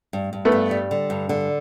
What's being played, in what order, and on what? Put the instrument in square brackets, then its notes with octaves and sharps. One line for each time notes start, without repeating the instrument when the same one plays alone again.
[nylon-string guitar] G2
G2
[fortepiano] A3 B3
[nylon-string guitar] G2
G3
D3
G2
D3